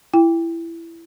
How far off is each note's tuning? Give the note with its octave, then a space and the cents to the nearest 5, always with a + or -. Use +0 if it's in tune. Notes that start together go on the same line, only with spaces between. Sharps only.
E4 +15 G5 +25